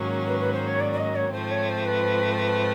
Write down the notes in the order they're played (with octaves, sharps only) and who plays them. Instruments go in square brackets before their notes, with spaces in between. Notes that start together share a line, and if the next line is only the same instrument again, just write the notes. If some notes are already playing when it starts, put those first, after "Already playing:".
Already playing: [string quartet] G#2 D#3 F#3 A#3 C#4
[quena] B4
B4
C5
C#5
D5
D5
D#5
C#5
[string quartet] G#2 F3 A3 C4 [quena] C5
[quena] C#5
C5
B4
C5
B4